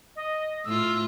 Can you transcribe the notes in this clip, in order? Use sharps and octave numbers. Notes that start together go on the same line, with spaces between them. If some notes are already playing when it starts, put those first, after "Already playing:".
D#5
A2 F4 E6